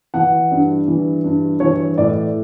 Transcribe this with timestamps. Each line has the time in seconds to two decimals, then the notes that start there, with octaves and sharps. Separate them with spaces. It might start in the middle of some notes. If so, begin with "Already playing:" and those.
0.14 E3 F#5
0.51 G2
0.88 E3
1.24 G2
1.60 E3 C#5
1.98 A2 D5